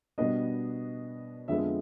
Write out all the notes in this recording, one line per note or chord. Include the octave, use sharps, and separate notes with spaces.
B2 G3 B3 D4 D#5
F2 D3 F3 G#3 B3 E5